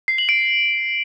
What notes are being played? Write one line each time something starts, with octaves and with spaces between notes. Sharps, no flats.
C7
F#7
D7